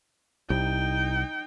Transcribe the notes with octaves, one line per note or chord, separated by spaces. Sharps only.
C2 D#4 G5